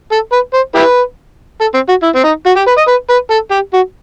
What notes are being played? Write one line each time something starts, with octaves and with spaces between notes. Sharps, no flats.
A4
B4
C5
E4 G4 B4
A4
C4
F#4
E4
C4
D#4
F#4
G4
B4
D#5
B4
B4
A4
G4
F#4